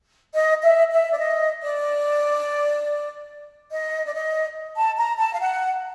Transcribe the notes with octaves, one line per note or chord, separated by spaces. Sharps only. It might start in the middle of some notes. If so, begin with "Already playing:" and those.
D#5
E5
E5
D5
D#5
D5
D#5
D5
D#5
A5
A#5
A5
F5
F#5